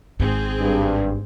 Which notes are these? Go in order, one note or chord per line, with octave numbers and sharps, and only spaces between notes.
G#1 G#2 C4 G#4
G2